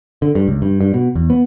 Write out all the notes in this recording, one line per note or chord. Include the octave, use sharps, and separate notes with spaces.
D3
G2
C#2
G2
G2
B2
E2
B3